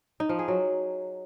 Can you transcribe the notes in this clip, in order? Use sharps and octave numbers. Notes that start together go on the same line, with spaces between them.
D#4
F3
G#4
F#3